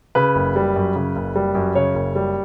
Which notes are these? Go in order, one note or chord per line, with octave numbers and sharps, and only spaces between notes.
C#3 B4
F#1
G3
F#2
C#3
F#1
G3
F#2
C#3 C#5
F#1
G3